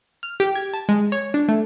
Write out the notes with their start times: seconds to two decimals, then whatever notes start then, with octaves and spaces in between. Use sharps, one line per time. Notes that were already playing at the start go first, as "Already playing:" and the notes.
0.23 F6
0.40 G4
0.55 G#6
0.74 A5
0.89 G#3
1.12 C#5
1.34 D4
1.48 A3